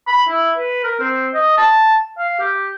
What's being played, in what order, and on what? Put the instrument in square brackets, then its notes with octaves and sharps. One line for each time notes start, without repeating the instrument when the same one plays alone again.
[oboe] B5
E4
B4
A#4
C4
D#5
A5
F5
G4